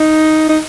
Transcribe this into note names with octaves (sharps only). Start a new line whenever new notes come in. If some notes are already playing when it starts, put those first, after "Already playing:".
Already playing: D#4
D#4